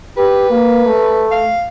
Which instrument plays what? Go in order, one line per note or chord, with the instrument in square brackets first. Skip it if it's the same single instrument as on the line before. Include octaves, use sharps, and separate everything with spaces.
[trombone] G4 [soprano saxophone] B4
[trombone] A#3
A3
[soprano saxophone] F5